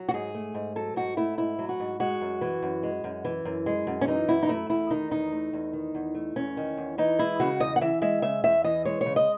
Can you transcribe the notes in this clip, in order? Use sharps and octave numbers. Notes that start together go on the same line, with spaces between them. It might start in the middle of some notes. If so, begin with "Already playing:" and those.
Already playing: F#3
F#4
G#2 G#4
A3
G#2
F#3 A4
G#2 F#4
A3 E4
G#2 E4
F#3
F#4
G#2
G#3 F#4
F#2
E3
F#2
G#3
F#2
E3
F#2
G#3
F#2
C#4
E3 D#4
F#2 E4
D#4
A3 E4
E2 E4
D#3 D#4
E2 D#4
A3
E2
D#3
E2
A3
E2 C#4
D#3
E2
E3 D#4
G#3 E4
C#3 F#4
E2 D#5
F#5
E3 E5
G#3 E5
C#3 E5
E2 E5
E3 D#5
G#3 C#5
C#3 C#5
D#5